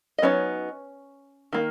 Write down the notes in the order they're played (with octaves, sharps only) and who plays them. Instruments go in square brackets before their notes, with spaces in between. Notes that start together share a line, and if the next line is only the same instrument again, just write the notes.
[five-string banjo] D#5
F#3 B3 C#4 D#4 C#5
D#3 A#3